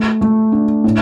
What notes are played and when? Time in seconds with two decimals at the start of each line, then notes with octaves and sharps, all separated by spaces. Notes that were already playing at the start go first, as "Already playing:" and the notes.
Already playing: A3
0.21 A3
0.52 D4
0.84 A2